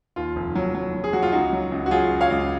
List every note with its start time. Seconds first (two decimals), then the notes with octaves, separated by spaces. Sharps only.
0.16 D#2 F4
0.36 F1
0.55 F#3
0.75 F#3
0.94 F#3
1.04 G#4
1.13 F#3 F#4
1.23 F4
1.32 C#2 D#4 F#4
1.53 F#3
1.72 C#2
1.86 F#4
1.91 F#3 F4 G#4
2.11 C#2
2.21 C#5 F5
2.30 C#2